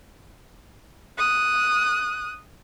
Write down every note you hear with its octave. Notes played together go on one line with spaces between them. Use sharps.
D#6 F#6